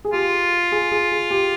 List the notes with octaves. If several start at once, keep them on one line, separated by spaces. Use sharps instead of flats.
G#4
F4 G4
G#4
G#4
G#4
G4